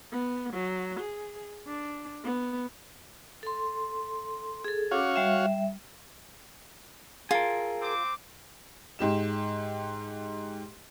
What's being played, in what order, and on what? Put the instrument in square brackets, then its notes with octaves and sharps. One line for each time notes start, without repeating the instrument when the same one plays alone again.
[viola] B3
F#3
G#4
D4
B3
[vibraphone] A4 C6
G#4 A4
[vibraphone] C#4 D6 [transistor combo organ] F#4 C#5 F5
[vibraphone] G3 E5
[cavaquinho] F4 [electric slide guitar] G#4 A#4
[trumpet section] C4 D6
[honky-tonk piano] G#2 G4 E7